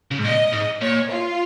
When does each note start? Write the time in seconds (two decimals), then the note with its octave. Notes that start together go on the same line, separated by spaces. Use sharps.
0.11 C#3
0.19 G#2
0.25 A#2 D#5
0.53 G#2
0.81 A#2 C#5
1.09 F4